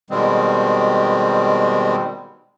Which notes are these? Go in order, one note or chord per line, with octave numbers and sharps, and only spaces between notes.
B2 D#3 G3 G#3 C4